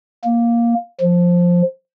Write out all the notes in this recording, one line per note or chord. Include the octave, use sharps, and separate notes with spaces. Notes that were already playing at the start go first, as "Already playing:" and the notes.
A#3
F3